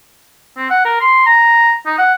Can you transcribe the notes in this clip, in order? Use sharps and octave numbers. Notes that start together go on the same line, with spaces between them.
C4
F#5
A#4
C6
A#5
D#4
F#5